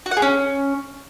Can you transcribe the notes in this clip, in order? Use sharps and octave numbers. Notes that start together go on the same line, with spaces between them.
F#4
F#5
G#4
C#4